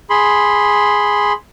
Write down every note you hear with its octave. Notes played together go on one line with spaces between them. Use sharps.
G#4 B5 C6